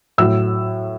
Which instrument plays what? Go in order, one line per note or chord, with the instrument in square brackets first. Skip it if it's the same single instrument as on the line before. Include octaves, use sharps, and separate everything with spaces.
[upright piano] A2 F#3 E6